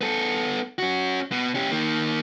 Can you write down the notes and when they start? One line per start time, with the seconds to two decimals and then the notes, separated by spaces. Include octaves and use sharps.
0.01 B3 A4
0.78 C#4 F#4
1.32 B2
1.55 C#4 G4
1.71 D#3 A#3